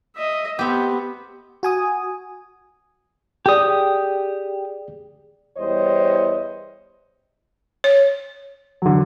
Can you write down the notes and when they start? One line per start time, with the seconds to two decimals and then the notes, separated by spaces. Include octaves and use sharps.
0.16 D#5 E5
0.59 B3 C4 G4
1.63 F#4 G#5 D#6
3.46 G4 G#4 D5 D#6
5.57 E2 G3 C5 C#5 D#5
7.84 C#5
8.82 D3 F#3